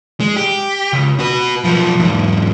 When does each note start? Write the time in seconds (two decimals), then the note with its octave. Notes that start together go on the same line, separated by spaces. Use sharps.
0.20 G#3
0.36 G4
0.93 C#2
1.20 F#4 B4
1.64 B1 F3
1.99 E2 G#2